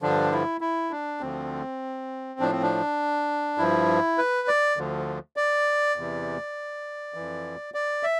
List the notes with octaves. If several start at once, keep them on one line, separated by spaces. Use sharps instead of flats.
G2 D3 F3 D4
E4
E4
D4
D2 D3 F3 C4
A2 F3 D4
C4
D4
G2 F3 E4
B4
D5
D2 D3 F3
D5
E2 C3 E3
F2 E3
D5
E5